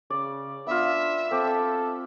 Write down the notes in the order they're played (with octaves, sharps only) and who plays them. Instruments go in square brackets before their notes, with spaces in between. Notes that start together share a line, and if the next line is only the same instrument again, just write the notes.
[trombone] C#3 [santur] D5
[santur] B3 F4 [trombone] D4 [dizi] E5
[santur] C4 D5 [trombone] A4